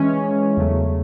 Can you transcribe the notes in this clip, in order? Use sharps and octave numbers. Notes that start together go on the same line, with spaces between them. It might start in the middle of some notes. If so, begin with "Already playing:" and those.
Already playing: E3 G#3 C#4
E2 C#3 F#3 A3